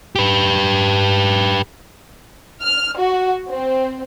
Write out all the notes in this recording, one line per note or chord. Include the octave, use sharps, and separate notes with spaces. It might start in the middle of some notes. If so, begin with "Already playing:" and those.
G4 B4
F6
F#4
C4